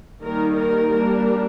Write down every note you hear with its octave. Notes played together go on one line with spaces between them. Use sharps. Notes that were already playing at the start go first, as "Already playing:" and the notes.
D#3 G3 A#3 D#4 A#4
A#4
G3 A#3 D4